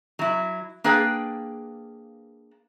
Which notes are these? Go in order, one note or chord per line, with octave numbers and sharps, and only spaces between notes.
F#3 E4
A#3 D4 G#4 B4 G5